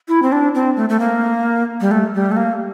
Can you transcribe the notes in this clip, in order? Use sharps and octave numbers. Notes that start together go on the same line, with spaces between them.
E4
C4
D4
C4
A3
A3
A#3
G3
A3
G3
A3
A#3